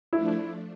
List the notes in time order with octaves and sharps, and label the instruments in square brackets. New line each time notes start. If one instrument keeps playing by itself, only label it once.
[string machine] F3 A3 D4 [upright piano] E4